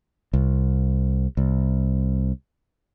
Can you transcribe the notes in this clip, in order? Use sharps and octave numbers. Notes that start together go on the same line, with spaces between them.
C2
C2